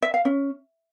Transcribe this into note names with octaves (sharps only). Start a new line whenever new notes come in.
E5
F5
C#4